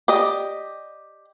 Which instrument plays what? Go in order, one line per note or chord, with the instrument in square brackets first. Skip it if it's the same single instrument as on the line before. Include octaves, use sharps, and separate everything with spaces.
[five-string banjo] G4 D5 D#5